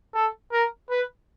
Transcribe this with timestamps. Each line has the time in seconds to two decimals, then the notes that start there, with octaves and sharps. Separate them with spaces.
0.15 A4
0.52 A#4
0.90 B4